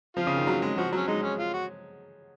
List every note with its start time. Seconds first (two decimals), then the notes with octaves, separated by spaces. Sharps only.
0.16 F3 F4
0.27 C#3
0.37 D#3
0.47 F#3
0.62 G#3
0.77 F3 F#4
0.92 F#3 C#4
1.08 G#3 D#4
1.23 C#4
1.39 F4
1.53 F#4